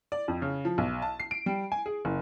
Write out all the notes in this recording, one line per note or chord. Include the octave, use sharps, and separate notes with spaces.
D5
F2
C#3
F3
B1
A5
C7
D7
G3
G#5
G#4
F#1